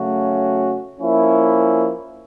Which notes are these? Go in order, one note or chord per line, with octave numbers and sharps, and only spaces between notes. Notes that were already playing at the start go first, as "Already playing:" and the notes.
Already playing: C#3 F#3 A3 C#4 F#4
F3 A#3 C#4 E4